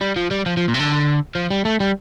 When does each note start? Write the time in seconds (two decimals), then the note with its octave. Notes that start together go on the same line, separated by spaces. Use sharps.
0.01 G3
0.16 F3
0.31 G3
0.46 F3
0.57 F3
0.68 A#2
0.74 C3
0.80 D3
1.35 F3
1.51 G3
1.65 A3
1.80 G3